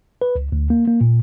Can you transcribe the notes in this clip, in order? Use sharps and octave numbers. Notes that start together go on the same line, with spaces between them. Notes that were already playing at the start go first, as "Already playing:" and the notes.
B4
C#2
D2
A#3
A#3
A#2